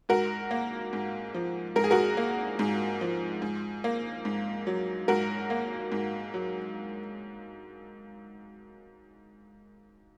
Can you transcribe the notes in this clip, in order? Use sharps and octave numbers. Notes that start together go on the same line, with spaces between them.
G#2 F#4 A#4
A#3
G#2
F3
G#2 A#4
G#4
F#4 A#4
A#3
G#2
F3
G#2
A#3
G#2
F#3
G#2 F#4 A#4
A#3
G#2
F#3